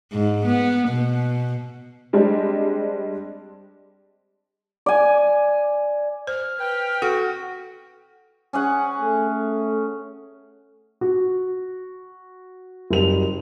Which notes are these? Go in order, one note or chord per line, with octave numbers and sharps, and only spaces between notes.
G#2
B3
B2
G3 G#3 C4 D4
D5 G#5
C5 F6
B4 G5
F#4 A4
C#4 G#4 F#5
A3
F#4
F#1 G3 F7